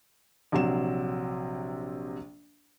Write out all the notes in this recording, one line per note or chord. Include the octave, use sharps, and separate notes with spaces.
A#1 C3 F#3 E7